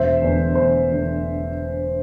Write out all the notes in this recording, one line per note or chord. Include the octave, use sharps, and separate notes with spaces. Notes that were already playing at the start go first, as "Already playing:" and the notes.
Already playing: E1 C5 E5
E2 D3
E1 C5
E2 D3